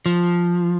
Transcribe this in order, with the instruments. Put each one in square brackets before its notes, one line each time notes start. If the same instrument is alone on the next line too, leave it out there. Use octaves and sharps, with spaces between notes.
[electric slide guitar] F3